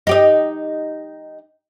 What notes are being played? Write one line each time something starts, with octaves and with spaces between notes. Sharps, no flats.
D#4 G4 D#5